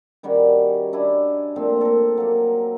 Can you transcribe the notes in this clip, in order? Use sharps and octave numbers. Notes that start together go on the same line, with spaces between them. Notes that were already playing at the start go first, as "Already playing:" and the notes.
D#3 G3 C#4 F#4
D4 E4 G#5
A#2 F3 A3 C4
A4 A#4
F#3 A#3